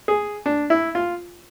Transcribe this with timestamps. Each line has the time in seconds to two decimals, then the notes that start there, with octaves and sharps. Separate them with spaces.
0.08 G#4
0.46 D4
0.70 E4
0.95 F4